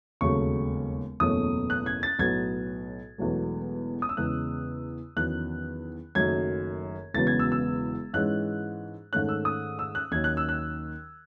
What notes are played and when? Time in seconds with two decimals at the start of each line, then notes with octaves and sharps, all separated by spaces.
0.21 E1 D#2 C#3 F#3 A3 C#6
1.20 F#1 E2 B2 A3 C#4 D#6
1.70 F#6
1.86 G#6
2.03 A6
2.19 B1 A2 F#3 B3 G#6
3.18 E1 E2 B2 F#3 A3
4.02 D#6
4.09 E6
4.17 E2 C#3 G#3 F#6
5.17 E2 D#3 F#3 C#4 F#6
6.15 F#1 F#2 D#3 F#3 A3 G#6
7.14 E1 E2 C#3 F#3 B3 A6
7.27 G#6
7.39 E6
7.52 E6
8.14 G#2 E3 G#3 C#4 F#6
9.13 G#2 D#3 A3 C#4 F#6
9.29 E6
9.45 D#6
9.79 E6
9.95 F#6
10.11 D#2 D#3 F#3 C#4 G#6
10.24 F#6
10.37 E6
10.49 F#6